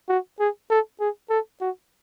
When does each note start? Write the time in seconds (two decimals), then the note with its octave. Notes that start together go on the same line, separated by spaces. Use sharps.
0.09 F#4
0.40 G#4
0.70 A4
1.00 G#4
1.30 A4
1.61 F#4